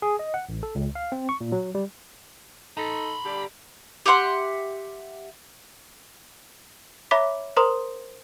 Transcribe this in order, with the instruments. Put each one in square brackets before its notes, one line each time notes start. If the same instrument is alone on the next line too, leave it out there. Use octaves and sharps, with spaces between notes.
[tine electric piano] G#4
D#5
F#5
A1
A4
C#2
F5
C4
C#6
A#2
F#3
G3
[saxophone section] D#4 A4 [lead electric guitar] A#5 B5
[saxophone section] D3 G3 G4
[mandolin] G4 E5 F#5 C6
[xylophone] C#5 E5 A#5 B5 D6 B6
A#4 C5 A#5 C6 D#6